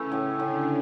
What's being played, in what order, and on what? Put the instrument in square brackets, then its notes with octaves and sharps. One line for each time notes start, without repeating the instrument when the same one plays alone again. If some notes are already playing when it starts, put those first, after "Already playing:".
Already playing: [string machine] C#3 C#4 [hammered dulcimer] E3 A3
[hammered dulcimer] A2
[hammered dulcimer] A2 [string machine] D3 D4